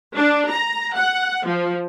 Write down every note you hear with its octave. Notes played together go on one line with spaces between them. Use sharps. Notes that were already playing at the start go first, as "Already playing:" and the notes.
D4
A#5
F#5
F3